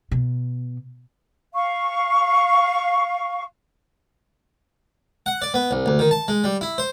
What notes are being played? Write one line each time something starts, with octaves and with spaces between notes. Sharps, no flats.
B2
F5 C#6
F#5
D5
B3
C2
D2
D#3
A5
G#3
G3
E4
C5